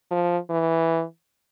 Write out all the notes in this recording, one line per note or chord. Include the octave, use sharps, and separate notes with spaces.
F3
E3